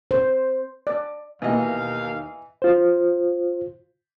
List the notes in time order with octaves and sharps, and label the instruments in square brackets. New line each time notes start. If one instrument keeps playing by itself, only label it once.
[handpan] C5
[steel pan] D5
[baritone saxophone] D#2 [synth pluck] B2 A#3 [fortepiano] E3 D#5 [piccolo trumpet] F5
[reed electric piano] F4 C5